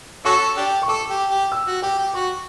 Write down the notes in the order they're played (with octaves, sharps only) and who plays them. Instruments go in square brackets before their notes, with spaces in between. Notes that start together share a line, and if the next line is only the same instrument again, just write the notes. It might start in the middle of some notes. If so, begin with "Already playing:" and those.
[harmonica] C#4 F#4 A4 [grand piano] C#6
[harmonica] D4 G4
[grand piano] C#6
[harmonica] A4 [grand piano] D6
[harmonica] G4
G4
[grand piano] E6
[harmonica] F#4
[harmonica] G4 [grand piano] D6
[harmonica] G4
[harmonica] F#4 [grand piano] C#6